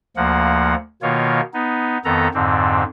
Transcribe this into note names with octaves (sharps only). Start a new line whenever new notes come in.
D2 F3 A#3 F#5
B2 D#3 A#3 F4 C#5
B3 D#4
F2 D#3 B3 A4 A#5
F2 G#2 D3 C4